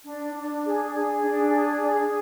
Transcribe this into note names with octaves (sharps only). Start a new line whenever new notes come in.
D4
D4
G#4
G#4
D4
G#4
G#4